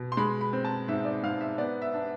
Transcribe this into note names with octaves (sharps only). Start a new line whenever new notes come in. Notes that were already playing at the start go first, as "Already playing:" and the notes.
Already playing: B2
C6
G#3 B5
B5
C4
A5
G#2 E5
D5
G#2 F5
E5
B3 D5
E5
D4